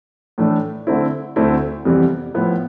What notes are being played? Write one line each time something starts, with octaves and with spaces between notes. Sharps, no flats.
A2 E3 A3 D4
D3 A3 C4 E4
D2 D3 A3 C4 E4
F2 C3 E3 G3 B3
A2 F3 B3 E4